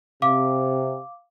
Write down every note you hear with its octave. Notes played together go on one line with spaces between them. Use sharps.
C3 F5 D6